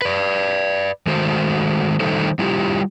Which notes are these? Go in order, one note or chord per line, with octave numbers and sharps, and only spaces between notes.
B4 D5
D#3 G#3 A3 F#4 C5
D#3 G3 A3 D#4 A4 C5
G3 E4 F4 G4